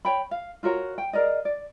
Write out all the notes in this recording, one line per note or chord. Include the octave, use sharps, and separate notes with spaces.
C#5 G5 B5
F5
F4 F#4 A#4 C#5
G5
G#4 A#4 D5 D#5
D5